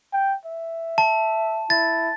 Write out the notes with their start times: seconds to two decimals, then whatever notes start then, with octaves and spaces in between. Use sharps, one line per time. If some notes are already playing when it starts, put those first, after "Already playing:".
0.13 G5
0.45 E5
0.98 A5
1.70 E4 A6